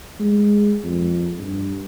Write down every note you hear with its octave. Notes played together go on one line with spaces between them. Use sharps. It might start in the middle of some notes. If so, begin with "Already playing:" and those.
G#3
F2
G2